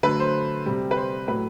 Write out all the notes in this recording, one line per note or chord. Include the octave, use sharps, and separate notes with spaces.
D3 F#3 A3 B4
C5
C3 G3
B4
C5
A2 F#3 A3 B4